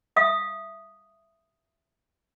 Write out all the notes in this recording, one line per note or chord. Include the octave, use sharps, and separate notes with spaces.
E5 F5 D#6